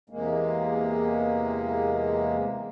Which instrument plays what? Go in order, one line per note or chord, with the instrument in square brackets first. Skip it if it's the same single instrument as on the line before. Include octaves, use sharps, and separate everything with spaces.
[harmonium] E2 C3 G#3 A#3